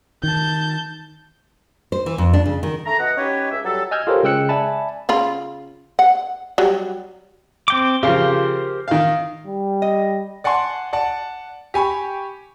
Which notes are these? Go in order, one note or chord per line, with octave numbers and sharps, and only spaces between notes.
D#3 A5 G6
C5
E3
F2
D4
C#3
D#3
A3 A#5
B2 D#5 F#5
C#4 D#4 G4 B4 C#5
C#2 E5
F#3 G3 A4
D#5 G#5 E6 F6 G6 G#6
F4 G4 A4 A#4 C5 C#5
C#3 G#3 G5 E6 F#6 C#7
D5 E5 G#5 A5 B5
C#3 F4 B5
F#5
F#3 G3
C4 G5 D6
C#3 F3 G4 A#4 C5
D#3 F5
G3
D#5
D5 F#5 G#5 A5 C6
D5 F#5 A5
G4 G#5 B5 C#6